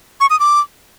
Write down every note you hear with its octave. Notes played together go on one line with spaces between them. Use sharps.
C#6
D#6
D6